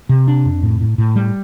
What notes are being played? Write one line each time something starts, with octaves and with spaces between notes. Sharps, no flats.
C3
D4
F2
A2
A2
A2
G3